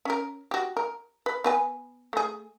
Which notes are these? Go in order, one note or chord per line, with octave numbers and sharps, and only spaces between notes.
C#4 A#4
F#4 G4
A#4
B4
B3 B4 G#5
A3 G#4